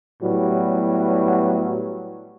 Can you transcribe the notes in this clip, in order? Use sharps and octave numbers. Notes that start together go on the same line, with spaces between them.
A2 F#3 G3 B3